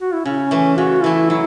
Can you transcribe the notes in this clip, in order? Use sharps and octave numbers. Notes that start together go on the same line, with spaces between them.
F#4
E4
C#3 C#4
E3 A3
C#3 F#4
E3 A3 E4
F#3 E4